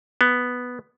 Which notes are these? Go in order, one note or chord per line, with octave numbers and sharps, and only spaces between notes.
B3